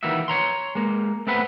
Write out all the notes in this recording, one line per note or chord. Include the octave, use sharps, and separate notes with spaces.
D#3 E3 G3 A#3 F#4 E5
C#5 A#5 C6
G#3 A#3
A3 C4 A4 B4 F#5 B5